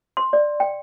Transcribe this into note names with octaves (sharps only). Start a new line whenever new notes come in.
C6
D5
G5